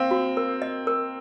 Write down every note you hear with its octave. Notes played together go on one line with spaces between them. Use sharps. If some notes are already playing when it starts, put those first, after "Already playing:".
Already playing: A#3 C4 F5
F#4
A#4
D#5
A#4